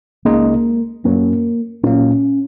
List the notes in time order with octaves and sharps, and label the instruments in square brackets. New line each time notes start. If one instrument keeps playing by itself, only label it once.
[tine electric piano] C#2 C#3 G#3 D#4 [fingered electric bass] A#3
[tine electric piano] F#2 F#3 C#4 [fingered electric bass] A#3
[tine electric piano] A#2 F#3 A#3 [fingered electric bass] C#4